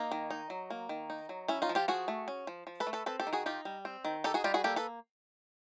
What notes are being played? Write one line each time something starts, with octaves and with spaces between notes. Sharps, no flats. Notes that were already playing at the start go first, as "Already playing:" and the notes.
Already playing: A#3 D#4
D#3
D#4
F#3
A#3
D#3
D#4
F#3
C#4 E4
D#4 F4
F3
F4 G4
F3 F#4 G#4
A3
C#4
F3
F3
A4 B4
A3
A4 B4
C4 A4 B4
G4 A4
D#3
F#4 G#4
D#4 F4 G4
G3
C4
D#3
D#4 G4 A4
F#4 G#4
G3 F4 G4
F#4 G#4
A#3 G4 A4
A4 B4